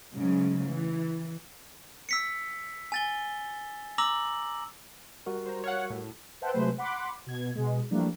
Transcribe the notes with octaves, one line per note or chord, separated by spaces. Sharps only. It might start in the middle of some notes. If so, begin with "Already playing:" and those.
G#2 C#3 F#3 A3
E3
E6 B6 C#7
G#5 A6 G7
A#5 D6 E6 A#6 F#7
G3 F#4 A#4
C5 A#5
C#5 F5 F#5
A2
B4 C5 E5 F#5 G5 A5
C3 F#3 G#3 A3 B4 C5
F#5 B5 C6 D6
B2 G#6
B2 G#3
E3 F3 G3 A3 A#3 D4